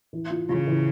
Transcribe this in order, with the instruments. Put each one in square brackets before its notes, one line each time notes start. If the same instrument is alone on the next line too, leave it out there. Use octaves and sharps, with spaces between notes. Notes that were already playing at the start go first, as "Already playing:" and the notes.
[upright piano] E3
F4
[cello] C#3 [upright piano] F4
[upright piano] E3